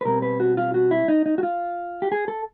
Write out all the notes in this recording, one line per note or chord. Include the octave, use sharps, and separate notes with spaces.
B4
B2 G3 C4 A#4
B4
F#4
F4
F#4
E4
D#4
D#4
F#4
F4
G4
G#4
A4